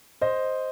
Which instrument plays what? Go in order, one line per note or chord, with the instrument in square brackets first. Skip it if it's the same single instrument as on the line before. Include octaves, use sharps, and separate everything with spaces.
[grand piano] C5 D#5